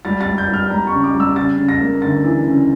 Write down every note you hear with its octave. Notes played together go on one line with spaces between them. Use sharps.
G3 A6
A6
G3
G6
G3
F6
G3 A#5
C#6
C#3
D6
G3
E6
C#3 A6
C#3
A#6
A#3
D2 A6
E3
C#3